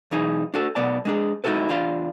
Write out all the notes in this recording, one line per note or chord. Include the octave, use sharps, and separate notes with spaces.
B1 E3 D#4 G#4
D4 F#4 A4
B1 B2 B3 D5 A5
G#3 D4 G#4
G#3 D#4 E4 F#4 A4 B4
E2 D4 F4 F5 C6